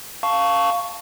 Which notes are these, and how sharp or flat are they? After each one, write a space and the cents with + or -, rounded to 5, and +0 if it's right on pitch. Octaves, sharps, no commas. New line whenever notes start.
F5 +0 A5 +0 C#6 +10